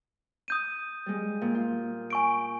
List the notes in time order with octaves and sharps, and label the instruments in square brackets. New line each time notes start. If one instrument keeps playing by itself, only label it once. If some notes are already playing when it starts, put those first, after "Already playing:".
[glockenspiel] D#6 G6 D#7
[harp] G3 G#3
A#2
F4
[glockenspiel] G#5 C#6 D7